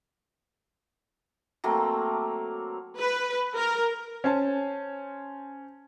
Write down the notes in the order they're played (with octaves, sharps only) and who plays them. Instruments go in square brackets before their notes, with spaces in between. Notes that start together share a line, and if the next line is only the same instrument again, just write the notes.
[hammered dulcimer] F#3 A3 A#3 C4
[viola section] B4
A#4
[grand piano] C#4 C5 G#5 A5